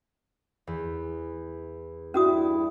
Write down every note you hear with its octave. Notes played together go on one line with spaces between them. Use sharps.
E2
G2 G3 C#4 E4 F#4 D#6